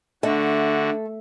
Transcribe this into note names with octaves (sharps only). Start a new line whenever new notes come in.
D3 A3 D4 F#4